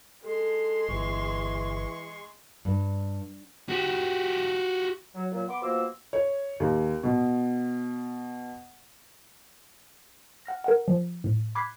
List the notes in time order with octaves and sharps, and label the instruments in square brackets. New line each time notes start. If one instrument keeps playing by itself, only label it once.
[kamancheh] G#3 C6 [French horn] A4
[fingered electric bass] G1 [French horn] E3 [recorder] C#6
[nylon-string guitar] G2
[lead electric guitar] F#4 G4
[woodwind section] F#3
A#2 F#3
B3 C6 D6
B2 F3 A#3 C6 E6
[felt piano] C#5
D#2
B2
[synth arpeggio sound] F#5 F6 A#6
A#4 F#5
F3
A2
B5 D6 F#6 G#6 B6 C7